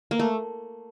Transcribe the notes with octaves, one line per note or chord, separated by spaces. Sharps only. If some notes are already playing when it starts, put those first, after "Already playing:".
A#3
A3